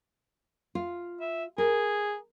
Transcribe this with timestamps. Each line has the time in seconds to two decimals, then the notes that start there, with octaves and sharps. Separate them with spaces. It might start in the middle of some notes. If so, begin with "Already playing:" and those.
0.75 F4
1.21 E5
1.58 G#4 A#4